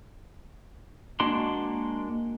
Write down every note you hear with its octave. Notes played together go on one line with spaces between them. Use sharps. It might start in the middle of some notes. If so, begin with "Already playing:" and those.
G#3 A#3 D4 F#4 C6